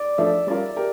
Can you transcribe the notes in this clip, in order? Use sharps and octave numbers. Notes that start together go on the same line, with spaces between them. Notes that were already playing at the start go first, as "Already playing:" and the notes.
Already playing: D5
F3 A3 D4 A4 E5
G3 C#4 F4 A#4 D5
G4 A#4